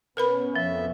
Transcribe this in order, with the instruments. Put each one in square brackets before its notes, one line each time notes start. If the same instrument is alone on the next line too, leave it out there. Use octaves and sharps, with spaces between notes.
[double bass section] B2 B3 C#4 [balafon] A#4 B4 B5
[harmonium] F2 E5 [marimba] F3